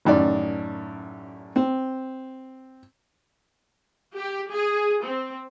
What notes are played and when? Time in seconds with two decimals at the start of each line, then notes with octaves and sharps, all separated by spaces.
0.05 A1 F#2 D#3 D5
1.56 C4
4.15 G4
4.50 G#4
5.03 C4